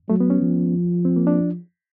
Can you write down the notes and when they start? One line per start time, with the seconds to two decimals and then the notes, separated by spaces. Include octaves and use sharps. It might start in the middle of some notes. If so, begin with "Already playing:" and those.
0.09 F#3 A3
0.20 B3
0.30 C#4
0.42 F3
1.05 C4
1.16 A#3
1.27 D4